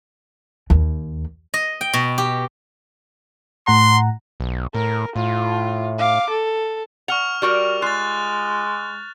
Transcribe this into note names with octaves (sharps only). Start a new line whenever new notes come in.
D#2
D#5
G5
B2
G4
A2 F#5 A#5 C6
B1
A2 A#4
A2 F4
F5 D6
A4
F#5 C#6 F6 F7
G3 F#4 A#4
G#3 F4 F#6 A6